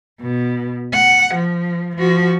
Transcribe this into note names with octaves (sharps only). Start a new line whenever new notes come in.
B2
F#5
F3
F3 F#4